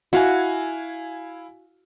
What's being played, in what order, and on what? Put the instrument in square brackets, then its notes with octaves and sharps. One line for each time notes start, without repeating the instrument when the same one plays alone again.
[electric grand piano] E4 F5 G#5 [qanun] F#4